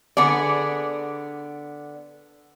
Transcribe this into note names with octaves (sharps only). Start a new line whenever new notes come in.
D3 B3 G#4 D5